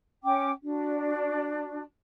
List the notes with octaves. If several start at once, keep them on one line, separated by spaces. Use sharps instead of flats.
C#4 G5 D6
D4 F#4